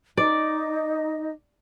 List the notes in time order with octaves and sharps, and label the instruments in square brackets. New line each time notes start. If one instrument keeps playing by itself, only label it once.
[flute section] D#4 D#5 [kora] D5